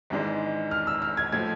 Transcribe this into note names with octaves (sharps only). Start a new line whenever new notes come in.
G#1 G#2 E3 G#3 D4
F6
E6
F6
G#6
A2 F3 G#6